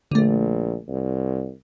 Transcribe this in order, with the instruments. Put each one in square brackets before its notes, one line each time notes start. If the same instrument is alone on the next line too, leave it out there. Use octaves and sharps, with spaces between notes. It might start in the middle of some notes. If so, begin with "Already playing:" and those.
[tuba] A#1 [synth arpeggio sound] D3 A3
[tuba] C2